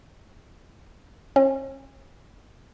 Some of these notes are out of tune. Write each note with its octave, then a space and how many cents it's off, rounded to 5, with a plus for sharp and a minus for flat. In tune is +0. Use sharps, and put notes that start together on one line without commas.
C#4 -40